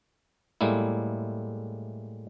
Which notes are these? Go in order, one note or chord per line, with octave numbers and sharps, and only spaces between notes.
A2 G3 G#3 A#3 E4